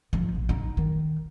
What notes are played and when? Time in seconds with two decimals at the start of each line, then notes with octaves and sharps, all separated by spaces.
0.13 F3
0.35 A#1
0.49 D#4
0.77 D#3